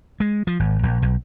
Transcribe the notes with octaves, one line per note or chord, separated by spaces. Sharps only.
G#3
F3
G#1
A#1
B1